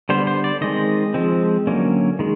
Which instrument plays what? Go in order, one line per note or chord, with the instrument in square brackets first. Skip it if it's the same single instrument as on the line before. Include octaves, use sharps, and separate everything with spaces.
[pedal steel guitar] D3 G3 B3 C5
C5
D5
D#3 G#3 C4 D#5
F3 G#3 C4
D3 F#3 A#3 C#4
D#3 G#3